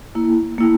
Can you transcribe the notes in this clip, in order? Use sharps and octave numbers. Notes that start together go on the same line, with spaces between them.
A#3 E4
A#3 E4